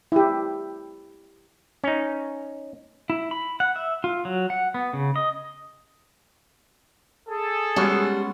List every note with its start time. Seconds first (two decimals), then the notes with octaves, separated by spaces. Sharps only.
0.12 E4 G4
1.84 C#4 D#4
3.10 E4
3.31 B5
3.60 F#5
3.76 E5
4.04 F4
4.25 F#3
4.50 F#5
4.74 B3
4.93 C#3
5.16 D#5
7.29 G#4 A4
7.76 G3 G#3 B3 C#4 F#4